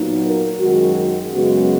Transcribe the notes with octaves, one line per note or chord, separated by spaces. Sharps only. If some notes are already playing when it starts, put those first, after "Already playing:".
Already playing: A#2 F#3 B3 D#4
A#4
F#2 D#3 G#3 F#4
F#2 C#3 G#3 B3 F#4